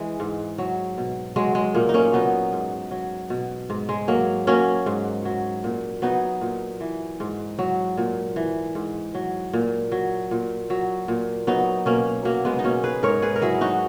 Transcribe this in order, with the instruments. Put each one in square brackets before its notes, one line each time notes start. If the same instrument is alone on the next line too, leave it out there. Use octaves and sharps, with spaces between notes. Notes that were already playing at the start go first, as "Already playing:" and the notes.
Already playing: [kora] E3 G#3
G#2
F#3
B2
F#3 G#3
G#3
A#2 A#3
D#4
A#3 C#4
F#3 B3 D#4
G#2
F#3
B2
G#2
G#3
F#3 A#3
F#3 A#3 C#4
G#2
F#3
A#2
F#3 B3 D#4
A#2
E3
G#2
F#3
A#2
E3
G#2
F#3
A#2
F#3
A#2
F#3
A#2
F#3 B3 D#4
B2 A#3 C#4
F#3 A#3
G#3 B3
D#4
B2 A#3 C#4
G#4 B4
G#2 A#4 C#5
G#4 B4
A#4
F#3 E4 G#4
D#4 F#4